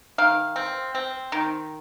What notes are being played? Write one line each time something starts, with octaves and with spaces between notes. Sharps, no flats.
D#3 F5
C4
C4
D#3